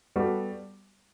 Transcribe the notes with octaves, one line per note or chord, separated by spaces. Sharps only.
G3 B3 F#4 A4